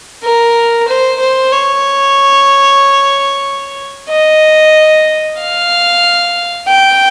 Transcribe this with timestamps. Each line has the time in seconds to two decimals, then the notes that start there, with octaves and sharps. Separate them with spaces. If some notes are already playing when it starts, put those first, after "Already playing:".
0.24 A#4
0.88 C5
1.20 C5
1.52 C#5
4.10 D#5
5.39 F5
6.68 G5